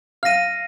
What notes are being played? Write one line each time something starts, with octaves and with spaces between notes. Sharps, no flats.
F5 F6 A#6 D#7